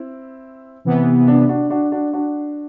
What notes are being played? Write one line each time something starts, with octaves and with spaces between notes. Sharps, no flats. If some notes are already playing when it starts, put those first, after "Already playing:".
Already playing: C4 E4
C3 E3 B3
D4
D4 F#4
D4 F#4
D4 F#4
D4 F#4